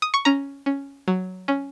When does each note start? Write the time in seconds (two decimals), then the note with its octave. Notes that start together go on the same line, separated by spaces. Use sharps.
0.02 D#6
0.14 C#6
0.25 C#4 A#5
0.66 C#4
1.08 F#3
1.48 C#4